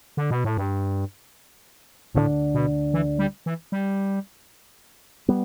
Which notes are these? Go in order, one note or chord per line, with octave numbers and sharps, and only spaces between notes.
D3
B2
A2
G2
D2 A2 D3 A3 D4
B2
E3
G3
E3
G3
G3 B3